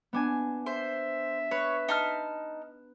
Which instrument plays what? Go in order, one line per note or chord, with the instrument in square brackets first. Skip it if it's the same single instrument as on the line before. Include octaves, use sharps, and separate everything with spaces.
[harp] B3 D4 G#5
[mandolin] C5 [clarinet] E5
[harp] B4 [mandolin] C#5
[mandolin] D#4 A5 F6